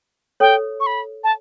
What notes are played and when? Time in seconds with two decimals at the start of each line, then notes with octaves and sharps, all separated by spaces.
0.40 A4 C#5 G5
0.80 C#6
0.86 B5
1.24 A5